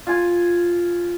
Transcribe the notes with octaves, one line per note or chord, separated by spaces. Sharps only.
F4 G#5